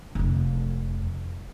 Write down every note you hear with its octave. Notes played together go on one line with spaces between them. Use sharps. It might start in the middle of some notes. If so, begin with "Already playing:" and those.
F1 F2